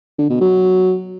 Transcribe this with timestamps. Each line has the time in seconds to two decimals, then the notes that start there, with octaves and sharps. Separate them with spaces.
0.18 D3
0.29 B2
0.41 F#3